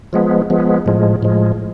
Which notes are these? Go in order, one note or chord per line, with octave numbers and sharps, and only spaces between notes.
F3 G#3 B3
F3 G#3 B3
A2 F3 G#3
A2 F3 G#3